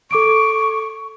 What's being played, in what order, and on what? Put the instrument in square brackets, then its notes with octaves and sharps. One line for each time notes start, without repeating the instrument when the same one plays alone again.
[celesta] A4 D6 D7 [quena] C#6